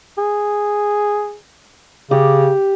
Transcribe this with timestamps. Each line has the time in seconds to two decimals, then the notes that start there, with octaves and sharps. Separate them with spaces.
0.18 G#4
2.11 C#3 G4